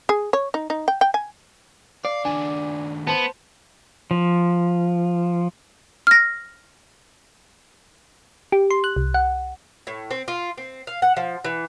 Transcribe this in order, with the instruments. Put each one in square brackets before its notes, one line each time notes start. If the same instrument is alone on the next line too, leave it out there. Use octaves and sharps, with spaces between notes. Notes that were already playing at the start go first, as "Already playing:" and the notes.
[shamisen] G#4
C#5
D#4
D#4
G5
G5
G#5
[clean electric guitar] D5 [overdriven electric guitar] F5
[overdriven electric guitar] D#2 D4 [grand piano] G#5
[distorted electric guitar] B3 [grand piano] C5 A5
[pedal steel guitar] F3
[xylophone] F6 A#6
[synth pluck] G4
C6
F#6
C2
F#5
[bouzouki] A2
C4
F4
C4
F5
F#5
F3
E3